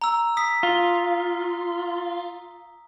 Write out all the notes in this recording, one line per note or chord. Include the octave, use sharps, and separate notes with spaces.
A#5 E6
D#6 B6
F4